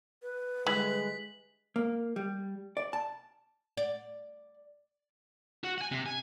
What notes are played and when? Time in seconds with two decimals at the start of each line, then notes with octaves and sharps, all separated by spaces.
0.23 B4
0.67 D3 E3 G3 G#3 B6 F#7
1.76 A#3
2.16 G3
2.77 D5
2.93 A5
3.77 D5
5.64 F#4 F#5
5.78 F#5 G#5
5.92 C3
6.06 G#5